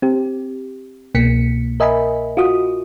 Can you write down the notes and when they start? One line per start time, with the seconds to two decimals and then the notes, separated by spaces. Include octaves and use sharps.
0.02 C4 G4
1.14 C2 B2 A#3 B6 C#7
1.80 A#4 D#5 E5 G#5 B5
2.37 F4 F#4 D#6